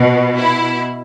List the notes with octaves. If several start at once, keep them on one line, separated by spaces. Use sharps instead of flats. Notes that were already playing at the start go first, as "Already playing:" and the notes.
Already playing: B2
E4